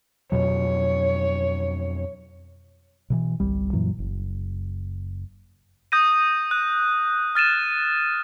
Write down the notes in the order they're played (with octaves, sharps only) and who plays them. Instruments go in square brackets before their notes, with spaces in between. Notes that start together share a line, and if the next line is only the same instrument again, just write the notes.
[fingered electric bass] F2 B2 F#3 [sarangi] C#5
[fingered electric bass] B2 D#3 E3
G1 C2 G3
F#2 A#2 E3 F#3
F#1
[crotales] D#6 G6 A#6 D#7
F#6
F6 A6 D#7 E7